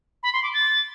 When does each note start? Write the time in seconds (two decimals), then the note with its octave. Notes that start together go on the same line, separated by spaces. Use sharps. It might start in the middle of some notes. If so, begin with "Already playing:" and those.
0.23 B5
0.33 C6
0.43 D6
0.54 A6